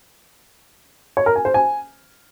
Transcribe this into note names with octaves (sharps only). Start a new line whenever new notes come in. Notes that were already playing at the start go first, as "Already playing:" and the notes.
C#5
A#4
G#5
C5
G#5